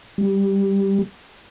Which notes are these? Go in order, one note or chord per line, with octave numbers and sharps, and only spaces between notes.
G3